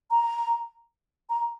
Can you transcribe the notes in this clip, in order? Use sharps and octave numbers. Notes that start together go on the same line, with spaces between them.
A#5
A#5